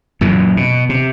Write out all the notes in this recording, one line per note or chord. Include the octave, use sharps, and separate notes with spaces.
F#2 A#2 E3
B2
C3